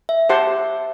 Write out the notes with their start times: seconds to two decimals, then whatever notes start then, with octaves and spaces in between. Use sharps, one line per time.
0.09 E5
0.29 G4 C5 F#5 A5 C6